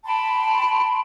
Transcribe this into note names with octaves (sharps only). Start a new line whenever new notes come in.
G5 A5 B5 C6